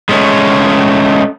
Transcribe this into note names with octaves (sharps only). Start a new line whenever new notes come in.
G#3 A3 C#4